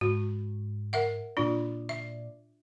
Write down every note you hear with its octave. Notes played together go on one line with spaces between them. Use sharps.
G#2 F#4
A#4 E5 F#5
A#2 D4 F4 D5
E5